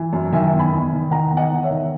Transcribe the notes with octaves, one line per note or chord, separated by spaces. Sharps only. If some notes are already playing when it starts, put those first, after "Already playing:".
Already playing: E3
F#2
D#3 E5 G#5
E2
G#5 B5
E2
D#3
D#3 F#5 A#5
E2
D#5 F#5
E2
C#5 E5
D#3